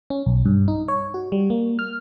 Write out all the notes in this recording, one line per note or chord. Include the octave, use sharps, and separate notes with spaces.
C#4
B1
G2
D#4
C#5
F#4
G3
A#3
F6